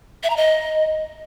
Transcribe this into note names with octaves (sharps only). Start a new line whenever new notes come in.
E5
A#5
D#5